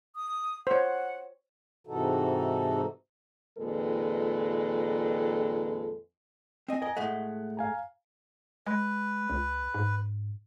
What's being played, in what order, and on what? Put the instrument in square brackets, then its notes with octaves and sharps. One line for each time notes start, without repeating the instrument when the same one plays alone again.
[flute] D#6
[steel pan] C5 C#5 [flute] F#5
[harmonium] G#2 C3 E3 D#4 F#4 A4
[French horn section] F2 A#2 D#3 G#3 A4 B4
[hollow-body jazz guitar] C4 D#5 G#5
[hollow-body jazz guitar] A#4 D#5 [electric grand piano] G#5
[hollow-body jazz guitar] A2 G#3 A3 [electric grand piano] F#5
[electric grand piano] F5 G#5 A#5
[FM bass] G#3 [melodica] B4
[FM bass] C#2
G#2